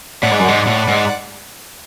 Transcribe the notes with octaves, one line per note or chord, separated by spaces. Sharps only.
A2 D5 F#5
G#2
F#2
G#2
A2
G#2